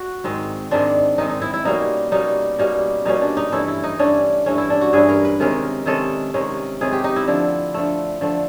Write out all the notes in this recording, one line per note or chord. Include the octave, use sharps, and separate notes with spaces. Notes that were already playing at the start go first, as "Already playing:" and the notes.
Already playing: F#4
G#2 D#3 G#3 C4
G#2 D#3 G#3 C4 D4
G#2 D#3 G#3 C4 D#4
D#4
E4
E4
B2 G3 A#3 C#4 D#4
B2 G3 A#3 C#4 D#4
B2 G3 A#3 C#4 D#4
B2 G3 A#3 C#4 D#4
D4
D#4
G2 E3 A3 C#4 E4
E4
D#4
G2 E3 A3 C#4 D4
G2 E3 A3 C#4
E4
D4
F#4
G2 E3 A3 C#4 G#4
A#4
B4
C3 D#3 G#3 C#4 A#4
C3 D#3 G#3 C#4 A4
C3 D#3 G#3 C#4
C3 D#3 G#3 C#4 G#4
G4
D#4
E4
D3 F3 A3 E4
D3 F3 A3
D3 F3 A3